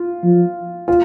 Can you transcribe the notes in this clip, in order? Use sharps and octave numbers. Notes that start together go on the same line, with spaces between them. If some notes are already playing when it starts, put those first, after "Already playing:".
Already playing: F4
F3
F4